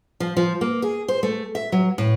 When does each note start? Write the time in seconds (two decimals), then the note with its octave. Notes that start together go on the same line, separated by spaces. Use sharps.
0.20 F3
0.37 F3
0.61 A#3
0.82 G#4
1.08 C5
1.23 A3
1.55 E5
1.72 F#3
1.98 A2